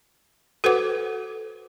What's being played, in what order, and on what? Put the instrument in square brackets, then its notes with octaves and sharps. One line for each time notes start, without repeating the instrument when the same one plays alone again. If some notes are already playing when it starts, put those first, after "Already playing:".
[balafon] F#4 A4 B4 C5 F#5 D6